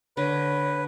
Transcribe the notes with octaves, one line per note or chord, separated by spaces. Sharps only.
D3 B4 C#5